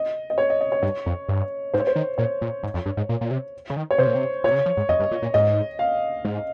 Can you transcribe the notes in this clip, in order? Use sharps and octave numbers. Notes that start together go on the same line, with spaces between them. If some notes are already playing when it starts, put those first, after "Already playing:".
Already playing: D#5
D#5
C#5
D#5
D#5
C#5
G2
F2
G2
G#2 C5
C#5
C5
D#3
A#2 C#5
A#2
G#2
F2
G2
G#2
A#2
A#2
C3
C#3
D#3
C#5
C3 C5
A#2
C3
A#2 C#5
C3
C#3
F3
G#2
F2 D#5
G2
A#2
A#2
G#2 D#5
F5
G#2